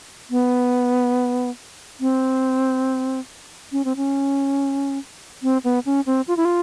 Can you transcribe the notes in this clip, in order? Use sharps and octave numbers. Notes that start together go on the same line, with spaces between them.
B3
C4
C#4
C4
C#4
C4
B3
C#4
C4
F4
E4
F4